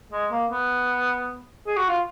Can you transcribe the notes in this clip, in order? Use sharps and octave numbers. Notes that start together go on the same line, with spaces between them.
G#3
A#3
B3
G#4
F#4
F4